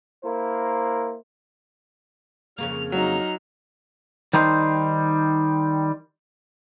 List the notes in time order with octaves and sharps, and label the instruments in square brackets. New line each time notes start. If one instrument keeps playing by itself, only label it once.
[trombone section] A#3 E4 A#4 C5
[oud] F2 C#3 A#3 [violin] F6
[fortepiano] F#3 [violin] D#4 F6
[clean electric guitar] D#3 G3 D#4 C5 C6